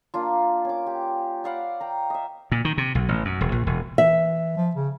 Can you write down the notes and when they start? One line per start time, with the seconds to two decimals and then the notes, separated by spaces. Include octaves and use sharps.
0.14 A#3 D4 F4
0.65 C#4 D6
0.86 G4
1.44 D5 F5 F#5 B5
1.80 G5 A#5
2.10 D#5 E5
2.52 A#2
2.65 D#3
2.78 C3
2.95 B1
3.08 A1
3.25 F#2
3.41 E1
3.52 A#1
3.67 E1
3.98 E3 E5
4.57 F3
4.75 C#3